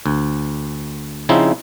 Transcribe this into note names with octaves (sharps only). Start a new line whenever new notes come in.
D2
C#3 F3 C4 D#4 E4